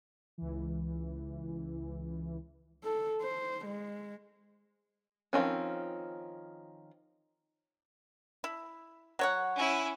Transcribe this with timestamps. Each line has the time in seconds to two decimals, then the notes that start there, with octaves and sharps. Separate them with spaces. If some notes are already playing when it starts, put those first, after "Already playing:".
0.38 C#2 E3
2.84 A4
3.22 C5
3.65 G#3
5.33 D#3 F3 G#3 C4 C#4
8.44 E4
9.19 F#3 C#5 F#5
9.56 C#4 E4